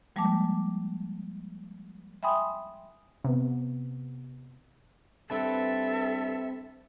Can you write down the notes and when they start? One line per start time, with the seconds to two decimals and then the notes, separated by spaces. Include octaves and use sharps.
0.16 F3 G3 G#3 A#3 A5 D6
2.23 E5 G5 G#5 B5 C6 D#6
3.24 C3 B3
5.30 G2 C4 A4 B4 E5 A5